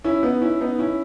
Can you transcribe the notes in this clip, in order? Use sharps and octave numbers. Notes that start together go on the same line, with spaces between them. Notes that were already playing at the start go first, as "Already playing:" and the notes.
C#4 E4
B3 D#4
C#4 E4
B3 D#4
C#4 E4